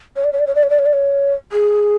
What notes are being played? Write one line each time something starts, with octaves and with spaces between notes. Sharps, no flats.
C#5
D5
C#5
D5
C#5
D5
C#5
D5
C#5
D5
C#5
G#4